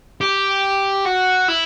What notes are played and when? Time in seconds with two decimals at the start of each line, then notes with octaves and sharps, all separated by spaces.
0.21 G4
1.05 F#4
1.48 E4